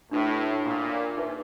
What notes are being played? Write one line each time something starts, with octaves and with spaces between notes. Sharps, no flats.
A2 D4 F#4 B4 E5
A#2
D#4 G#4 B4 E5